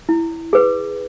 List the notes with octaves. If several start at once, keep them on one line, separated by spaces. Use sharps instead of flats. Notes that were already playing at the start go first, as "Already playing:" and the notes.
E4
G#4 B4